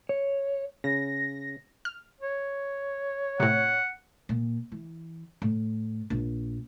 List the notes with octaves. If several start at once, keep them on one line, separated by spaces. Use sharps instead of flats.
C#5
C#3 A#6
F6
C#5
A2 C3 F#5
A#2
E3
A2
A#1